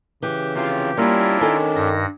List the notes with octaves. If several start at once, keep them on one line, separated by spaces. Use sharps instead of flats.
C#3 E3 G4
C3 F4 G4 F5
G3 A#3 C#4 D4 E4 F4 A#4
D#3 A4 G#5
G2 A#6